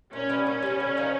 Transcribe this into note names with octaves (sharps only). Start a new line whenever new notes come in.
A#2 C#4
G3 B3
A#2 C#4
G3 B3
D3
F3 A#3 D#4